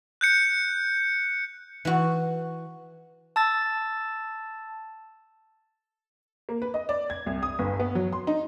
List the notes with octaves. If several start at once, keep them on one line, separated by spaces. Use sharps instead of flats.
F#6 G6 C#7
E3 F#4
A5 E6 A6
A#3
B4
D#5
D5
G#6
C2
D#6
G1
B3
F#3
C6
D#4